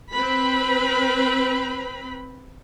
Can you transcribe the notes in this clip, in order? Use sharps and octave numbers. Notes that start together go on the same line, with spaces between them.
C4 B4 B5